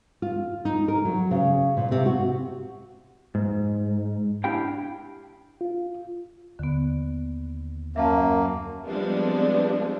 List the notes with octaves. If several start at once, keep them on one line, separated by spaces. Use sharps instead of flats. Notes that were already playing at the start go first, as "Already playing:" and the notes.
F4
D#4
A#4
F#3
C#3
A#2
C3
F#4
G#2
D4 E4 G4 F5 G5
F4
D#2 D3 B3
F#2 A#3 E5 F5 A5
F3 G3 G#3 B3 C4 D4